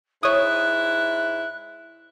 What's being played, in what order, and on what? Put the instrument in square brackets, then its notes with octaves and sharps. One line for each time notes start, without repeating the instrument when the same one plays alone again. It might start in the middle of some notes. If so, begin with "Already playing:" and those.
[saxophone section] G#2 E4 [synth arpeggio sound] C#5 D#6 [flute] F#6